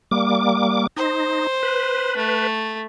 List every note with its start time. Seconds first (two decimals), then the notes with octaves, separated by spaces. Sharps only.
0.11 G3 A#3 D6
0.97 D#4 C5
1.63 B4
2.16 A3